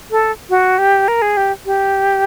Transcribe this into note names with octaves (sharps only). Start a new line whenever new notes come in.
A4
F#4
G4
A#4
G#4
G4
G4